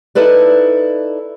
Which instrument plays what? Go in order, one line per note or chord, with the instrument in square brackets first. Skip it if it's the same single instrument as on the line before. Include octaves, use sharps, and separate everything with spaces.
[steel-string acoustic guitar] D#4 E4 A4 B4 D5